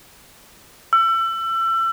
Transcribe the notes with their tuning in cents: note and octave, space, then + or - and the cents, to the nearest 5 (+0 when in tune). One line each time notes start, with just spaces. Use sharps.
E6 +30